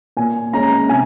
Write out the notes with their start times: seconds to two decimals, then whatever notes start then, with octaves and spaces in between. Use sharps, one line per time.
0.17 A#2 G#5
0.53 G#3 C#4 A#5
0.89 C3 G#5